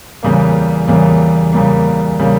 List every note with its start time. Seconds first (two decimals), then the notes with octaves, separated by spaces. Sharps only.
0.23 E2 C#3 G3 A#3
0.88 E2 C#3 G3 A#3
1.53 E2 C#3 G3 A#3
2.19 C#3 G3 A#3